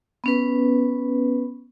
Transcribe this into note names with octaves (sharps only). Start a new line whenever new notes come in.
B3 C#4 B4